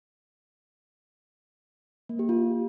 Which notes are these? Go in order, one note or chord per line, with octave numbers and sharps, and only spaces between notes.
A#3
G4
F4